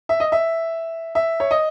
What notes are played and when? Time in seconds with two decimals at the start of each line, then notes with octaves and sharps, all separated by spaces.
0.09 E5
0.20 D#5
0.32 E5
1.15 E5
1.40 C#5
1.51 D#5